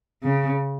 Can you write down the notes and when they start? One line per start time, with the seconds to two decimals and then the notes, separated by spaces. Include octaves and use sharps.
0.23 C#3